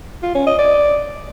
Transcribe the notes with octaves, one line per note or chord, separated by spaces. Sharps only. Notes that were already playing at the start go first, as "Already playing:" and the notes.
F4
C#4
D#5
D5